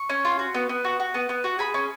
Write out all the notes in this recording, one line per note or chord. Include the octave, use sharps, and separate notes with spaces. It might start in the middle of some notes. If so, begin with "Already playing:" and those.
Already playing: C#6
C#4
F4
F#4
B3
B3
F#4
F#4
B3
B3
F#4
G#4 B5
C#4